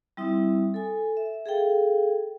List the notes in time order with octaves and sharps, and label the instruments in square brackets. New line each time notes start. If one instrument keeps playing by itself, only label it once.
[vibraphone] G3 C4 E4 E5 D#6
A4 G#5
E5
G#4 A4 F5 G5